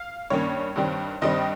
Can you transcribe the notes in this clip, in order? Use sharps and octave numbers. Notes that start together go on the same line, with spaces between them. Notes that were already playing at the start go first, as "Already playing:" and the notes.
Already playing: F5
G2 D#3 A#3 C#4 C#5
G2 D#3 G3 C4
G2 D#3 G3 C4 D#5